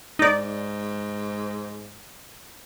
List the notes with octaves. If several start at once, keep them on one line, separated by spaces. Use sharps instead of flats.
G#2 D#4 D5